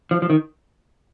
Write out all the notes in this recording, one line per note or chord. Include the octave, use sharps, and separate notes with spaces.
F3
F3
D#3